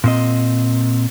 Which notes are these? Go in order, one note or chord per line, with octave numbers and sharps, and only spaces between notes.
A#2 C4 D#5